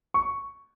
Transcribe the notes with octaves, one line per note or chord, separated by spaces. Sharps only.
C#6